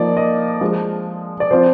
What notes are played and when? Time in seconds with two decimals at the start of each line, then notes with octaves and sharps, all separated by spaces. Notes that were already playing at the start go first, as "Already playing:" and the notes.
Already playing: F3 A#3 D#4 D5
0.17 D#5
0.61 F3 G#3 D4
1.40 D5
1.51 F3 C4 F4 C5